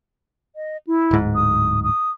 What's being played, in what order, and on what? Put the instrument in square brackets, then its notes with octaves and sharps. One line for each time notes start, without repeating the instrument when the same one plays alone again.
[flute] D#5
E4
[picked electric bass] D1 G#2
[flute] D#6
D#6